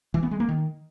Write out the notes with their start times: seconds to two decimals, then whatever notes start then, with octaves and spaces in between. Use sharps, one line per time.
0.14 E3
0.23 B3
0.31 G#3
0.40 A#3
0.48 D#3